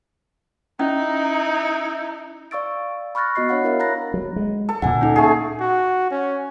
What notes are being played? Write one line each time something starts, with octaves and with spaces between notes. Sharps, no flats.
C#4 D#4 E4
D5 F5 C#6 E6 A6 D7
B5 C#6 F6 F#6 A6 A#6
B3 F#4 D#5 F#6 C7
D4 C#5 F5 F#5 B5
E4 A#4 E5
A#5 B5 F#6 A6 A#6
F#3
G#3
A4
D2 A#2 F#5 G#5
C#4 D#4 A4
A3 G#4
F#4
C#4